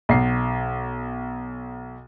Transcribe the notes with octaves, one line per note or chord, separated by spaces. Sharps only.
B1 C7